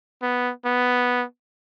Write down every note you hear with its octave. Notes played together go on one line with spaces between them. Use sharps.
B3
B3